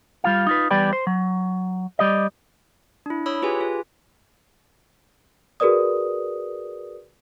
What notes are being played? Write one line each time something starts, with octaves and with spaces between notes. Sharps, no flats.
G3 F4 F5
D#4 F4 B4
E2 G3 G4 B4 D5 G5
C5
F#3
G3 G4 D5 D#5
D4 E4
C#5 B5 D#6 E6
F4 G4 G#4 B4 G#5
F4 G#4
F#4 G#4 A#4 B4 D5 D#6